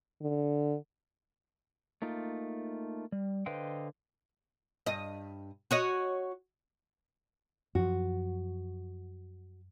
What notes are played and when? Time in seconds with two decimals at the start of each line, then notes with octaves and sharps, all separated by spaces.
0.22 D3
2.02 A3 A#3 D#4 F4
3.12 G3
3.46 D3 B4 C5 D#5 F5 G5
4.86 G2 D#5
5.71 F#4 C#5 D#5
7.75 F#2 F3 F#4